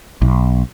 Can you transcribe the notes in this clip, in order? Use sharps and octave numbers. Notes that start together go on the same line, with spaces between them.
B1